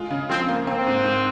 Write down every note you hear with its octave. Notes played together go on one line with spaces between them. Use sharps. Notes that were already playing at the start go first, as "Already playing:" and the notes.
Already playing: G#3 F4
C#3
F3 C4
A#3
A#3 C4
G#2
G#2